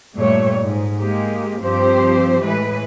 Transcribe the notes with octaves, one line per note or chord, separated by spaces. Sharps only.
G2 A#2 G3 A3 C#5
G#2
G#3 A#3 G4
G2 F3 C4 G4 C5
A2 E3 G#3 B4